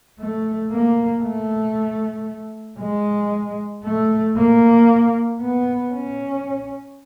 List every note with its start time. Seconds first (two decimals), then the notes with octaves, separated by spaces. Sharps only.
0.19 A3
0.70 A#3
1.23 A3
2.79 G#3
3.83 A3
4.36 A#3
5.40 B3
5.93 C#4